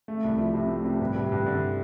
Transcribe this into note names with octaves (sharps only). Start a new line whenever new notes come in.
A3
C2
F3
C3
A3
C3
G2
G2
G2
D3